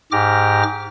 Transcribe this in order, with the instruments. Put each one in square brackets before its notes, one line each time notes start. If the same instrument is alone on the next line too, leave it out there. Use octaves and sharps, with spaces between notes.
[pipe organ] G#2 G4 D6 F6 A#6